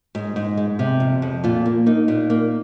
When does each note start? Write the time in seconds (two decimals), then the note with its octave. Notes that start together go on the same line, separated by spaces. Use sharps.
0.15 G#2
0.36 G#2
0.57 G#3
0.79 C3
1.00 F2
1.22 F2
1.44 A#2 F4
1.66 A#3
1.86 A#3 D#4
2.08 A#2
2.30 A#3